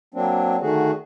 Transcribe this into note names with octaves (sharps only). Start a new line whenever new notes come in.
F#3 A#3 C4 D4
D3 D#3 A3 F#4 G#4